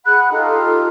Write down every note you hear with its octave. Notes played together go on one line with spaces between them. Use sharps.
G#4 F#5 B5 F#6
D#4 F4 G4 A4